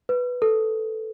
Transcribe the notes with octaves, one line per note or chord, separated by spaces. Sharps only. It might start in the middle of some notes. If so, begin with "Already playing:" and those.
B4
A4